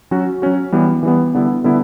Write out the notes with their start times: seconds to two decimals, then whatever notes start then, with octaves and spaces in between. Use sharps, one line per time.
0.11 F#3 C#4 F#4
0.42 F#3 C#4 F#4
0.72 E3 G3 B3
1.03 E3 G3 B3
1.34 D3 G3 B3 E4
1.64 D3 G3 B3 E4